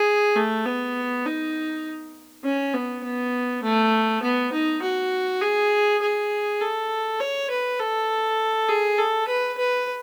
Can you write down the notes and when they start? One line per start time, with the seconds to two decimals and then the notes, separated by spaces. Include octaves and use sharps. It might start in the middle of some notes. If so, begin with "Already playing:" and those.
Already playing: G#4
0.36 A3
0.66 B3
1.25 D#4
2.44 C#4
2.74 B3
3.03 B3
3.63 A3
4.23 B3
4.52 D#4
4.82 F#4
5.41 G#4
6.01 G#4
6.61 A4
7.20 C#5
7.50 B4
7.80 A4
8.69 G#4
8.98 A4
9.28 B4
9.58 B4